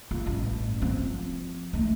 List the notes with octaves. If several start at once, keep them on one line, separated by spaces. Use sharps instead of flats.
F4
A1 G2
F3 C4
A3 D#4